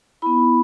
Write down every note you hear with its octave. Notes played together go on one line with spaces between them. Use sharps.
B3 E4 B5